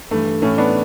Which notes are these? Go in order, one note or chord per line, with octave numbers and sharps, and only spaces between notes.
G2 E3 A3
A2 E3 A3 C#4
B3 D4